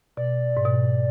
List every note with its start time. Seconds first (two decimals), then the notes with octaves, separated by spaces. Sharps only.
0.17 B2 D5
0.57 G#2
0.65 B2